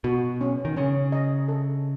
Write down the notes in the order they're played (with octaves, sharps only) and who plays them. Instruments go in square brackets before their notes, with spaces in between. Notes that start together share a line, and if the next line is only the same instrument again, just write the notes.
[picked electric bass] B2 [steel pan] F#4
[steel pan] C#4
[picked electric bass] D#3
[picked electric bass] C#3 [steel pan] C#4
[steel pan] D#5
A4